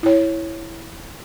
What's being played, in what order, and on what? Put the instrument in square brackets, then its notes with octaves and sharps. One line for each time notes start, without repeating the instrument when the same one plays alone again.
[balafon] E4 C#5